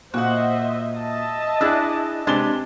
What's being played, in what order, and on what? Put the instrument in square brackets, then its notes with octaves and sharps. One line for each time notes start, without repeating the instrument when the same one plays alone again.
[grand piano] A#2 [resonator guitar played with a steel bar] F#4 F#5 [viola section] C5 D#5 E5
[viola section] D#5 E5 A5
[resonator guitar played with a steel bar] D4 E4 G#4 [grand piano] E6 F#6
[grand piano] C3 G7 [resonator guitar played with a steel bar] G#3 D4 B4